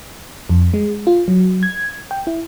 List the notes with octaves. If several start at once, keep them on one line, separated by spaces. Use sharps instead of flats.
F2
G#3
F4
F#3
G#6
G5
E4